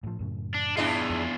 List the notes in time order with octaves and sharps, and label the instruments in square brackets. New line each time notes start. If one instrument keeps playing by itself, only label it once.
[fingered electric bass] A2 F3
F#2 A2 C#3
[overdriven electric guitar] D4
[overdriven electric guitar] E2 F4 [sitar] D4 E4 G#4
[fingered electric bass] F2